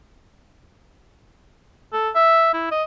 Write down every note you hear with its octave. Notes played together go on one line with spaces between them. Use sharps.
A4
E5
E4
D#5